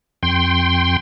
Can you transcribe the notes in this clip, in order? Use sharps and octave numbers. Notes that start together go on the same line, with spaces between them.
F2 G5 C6